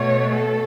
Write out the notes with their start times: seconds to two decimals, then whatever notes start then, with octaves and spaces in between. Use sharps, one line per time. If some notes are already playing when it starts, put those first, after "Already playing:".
Already playing: B2 A3 C#5
0.30 A4